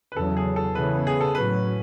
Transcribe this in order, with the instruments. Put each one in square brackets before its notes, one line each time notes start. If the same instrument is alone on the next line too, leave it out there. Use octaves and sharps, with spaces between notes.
[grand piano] B4
[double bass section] E2 C#3 F#3 [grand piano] A4
[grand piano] G#4
A4
[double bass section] C#3 E3 B3 [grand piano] B4
[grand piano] G#4
A4
[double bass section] A2 F#3 C#4 [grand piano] B4